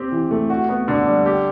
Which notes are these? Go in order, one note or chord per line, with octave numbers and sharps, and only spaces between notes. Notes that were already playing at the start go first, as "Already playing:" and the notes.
Already playing: C4 G4
E3
A3
F#4
B3
D3
G3
G4